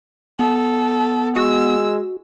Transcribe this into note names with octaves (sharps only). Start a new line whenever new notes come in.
B3 A4
G#3 F#4 E6